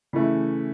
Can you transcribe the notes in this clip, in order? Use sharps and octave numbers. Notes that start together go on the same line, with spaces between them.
C#3 E3 A3 E4